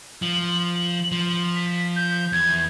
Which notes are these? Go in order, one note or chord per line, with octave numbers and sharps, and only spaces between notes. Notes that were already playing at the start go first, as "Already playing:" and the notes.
F3 F#7
F3
B6
G6
E2 G#6